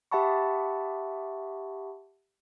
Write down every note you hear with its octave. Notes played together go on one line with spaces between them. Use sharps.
G4 E5 F#5 A5 B5 C#6